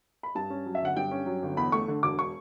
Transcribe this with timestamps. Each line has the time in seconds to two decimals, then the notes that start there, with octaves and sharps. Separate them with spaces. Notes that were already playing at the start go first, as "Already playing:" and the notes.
0.23 B5
0.35 G2 A5
0.50 C#4
0.66 F#3
0.75 E5
0.81 G1 F#5
0.96 G2 G5
1.11 C#4
1.26 F#3
1.42 G1
1.57 E2 B5
1.72 A3 C#6
1.88 D3
2.03 E1 D6
2.19 C#6